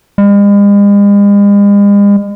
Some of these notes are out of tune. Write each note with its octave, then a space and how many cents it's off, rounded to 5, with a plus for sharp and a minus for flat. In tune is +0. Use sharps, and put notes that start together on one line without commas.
G#3 -45